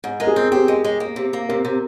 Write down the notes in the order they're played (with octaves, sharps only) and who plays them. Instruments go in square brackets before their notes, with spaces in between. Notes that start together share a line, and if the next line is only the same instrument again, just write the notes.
[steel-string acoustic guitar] G#2
[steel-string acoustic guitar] G#3 [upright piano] A#4
[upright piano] G#4
[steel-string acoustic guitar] C4
[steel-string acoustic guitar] C4 [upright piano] G4
[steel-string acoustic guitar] G#3
G#3
A#3
C3
A#3
[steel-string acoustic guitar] C3 [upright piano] A#4
[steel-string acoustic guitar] C3